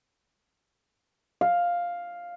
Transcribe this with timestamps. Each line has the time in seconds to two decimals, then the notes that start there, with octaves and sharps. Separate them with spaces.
1.41 F5